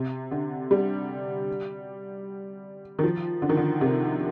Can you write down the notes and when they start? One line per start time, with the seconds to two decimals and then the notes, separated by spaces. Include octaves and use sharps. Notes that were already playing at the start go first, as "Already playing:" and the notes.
Already playing: C3
0.31 D3
0.71 G3
2.99 D#3
3.03 F3
3.42 D3
3.49 D#3
3.57 D3
3.81 C3